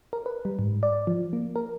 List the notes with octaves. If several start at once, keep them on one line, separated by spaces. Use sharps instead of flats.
A#4
B4
G3
G#2
D5
F3
A#3
A#4